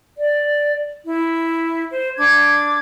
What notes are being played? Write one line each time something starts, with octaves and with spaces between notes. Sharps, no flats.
D5
E4
C5
D4 D6 G#6